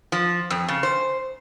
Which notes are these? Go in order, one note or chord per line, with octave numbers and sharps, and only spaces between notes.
F3
F2
C#3
C5